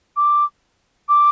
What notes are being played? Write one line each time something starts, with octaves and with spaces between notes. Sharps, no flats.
D6
D6